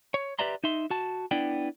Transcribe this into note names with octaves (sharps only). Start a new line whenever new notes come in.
C#5
G4 B4 D5 E5 A#5 C6
D#4 E5 C6
F#4 A5
B3 D4 E4 D5 G5